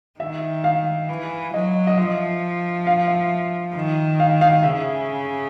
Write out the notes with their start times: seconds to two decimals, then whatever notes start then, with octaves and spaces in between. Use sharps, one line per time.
0.20 D#3 E5
0.64 F5
1.09 E3
1.53 F#3 D#5
1.87 D#5
1.97 F3 E5
2.87 F5
3.08 E5
3.75 D#3
4.20 F5
4.41 F5
4.63 C#3 E5